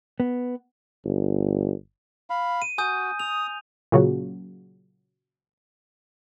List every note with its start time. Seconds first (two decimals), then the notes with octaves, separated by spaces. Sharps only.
0.20 B3
1.05 G1
2.30 F5 B5
2.62 D#7
2.78 F#4 G#5 D#6 G6
3.19 D#6 F7
3.92 A#2 C#3 F#3